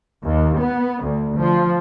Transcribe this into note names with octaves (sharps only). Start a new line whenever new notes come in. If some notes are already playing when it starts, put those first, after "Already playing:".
D#2
B3
D2
F3